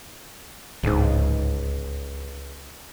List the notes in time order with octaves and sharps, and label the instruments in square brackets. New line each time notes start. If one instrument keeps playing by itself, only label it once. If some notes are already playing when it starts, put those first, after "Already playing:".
[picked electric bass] D1 G#2 [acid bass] C#2